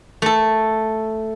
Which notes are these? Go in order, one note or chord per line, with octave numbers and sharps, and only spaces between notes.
A3 A4